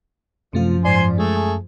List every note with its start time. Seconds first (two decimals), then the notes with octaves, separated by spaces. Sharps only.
0.53 F#2 C3 F3 A3 F4
0.85 G#2 C5 D5 G#5 C6
1.18 G#3 A3 G#4